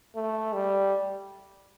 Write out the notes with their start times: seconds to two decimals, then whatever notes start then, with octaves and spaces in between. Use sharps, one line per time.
0.15 A3
0.53 G3